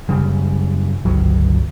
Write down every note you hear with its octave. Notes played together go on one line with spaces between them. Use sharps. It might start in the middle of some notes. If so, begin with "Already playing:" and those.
F#2 C#3 G3
G1 C#2 F#3